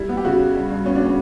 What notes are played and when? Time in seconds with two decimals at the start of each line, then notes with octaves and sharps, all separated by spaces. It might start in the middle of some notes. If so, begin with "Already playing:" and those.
Already playing: G3 E4
0.09 B3
0.17 G4
0.25 C#3 F#4
0.39 C#3
0.55 G2
0.71 G2
0.86 B3 C#4
0.95 D4
1.00 B3
1.06 C#4